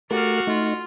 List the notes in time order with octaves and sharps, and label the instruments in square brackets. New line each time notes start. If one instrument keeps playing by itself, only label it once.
[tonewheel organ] A3 [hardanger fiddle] F#4 [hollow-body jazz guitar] G4 A#4 [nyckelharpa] D5 F5
[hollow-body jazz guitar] A3 [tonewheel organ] D#4 [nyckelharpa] F4